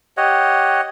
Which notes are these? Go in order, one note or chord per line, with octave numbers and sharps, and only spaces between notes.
G4 C#5 D#5 F#5